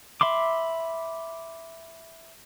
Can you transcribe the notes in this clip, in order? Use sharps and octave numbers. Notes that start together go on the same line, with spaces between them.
E5 B5 C6 D6